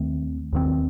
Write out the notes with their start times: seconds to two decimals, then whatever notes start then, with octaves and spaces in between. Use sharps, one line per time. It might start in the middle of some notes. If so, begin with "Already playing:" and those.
Already playing: D#2 D#3 A3 C4
0.53 D#2 D#3 A3 C4